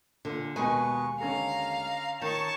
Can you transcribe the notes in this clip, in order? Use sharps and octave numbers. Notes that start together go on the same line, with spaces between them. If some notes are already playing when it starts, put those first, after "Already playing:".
A#2 D3
D#2 B2 G#3 B4 G#5 C#6
D3 C#4 A4 F5 A#5
D#3 D#4 C#5 A5 C#6